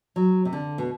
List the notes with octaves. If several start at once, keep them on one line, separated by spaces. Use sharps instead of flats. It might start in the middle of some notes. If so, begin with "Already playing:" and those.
F#3
C3
D3
B2